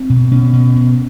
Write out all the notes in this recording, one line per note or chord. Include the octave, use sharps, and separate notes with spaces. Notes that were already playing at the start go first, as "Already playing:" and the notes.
Already playing: C4
B2
B2 C#4
B2
B2